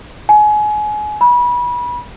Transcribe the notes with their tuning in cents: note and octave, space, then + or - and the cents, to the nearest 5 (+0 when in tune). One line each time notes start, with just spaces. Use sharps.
G#5 +25
B5 -25